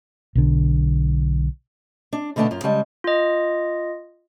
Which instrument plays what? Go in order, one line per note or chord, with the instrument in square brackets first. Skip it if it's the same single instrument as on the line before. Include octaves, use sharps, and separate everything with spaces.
[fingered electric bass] B1 D3
[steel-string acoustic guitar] D4
B2 D3 A3 B3 D4 A5
F#2 F4
C#3 G3 G#3 A5
[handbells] F4 D#5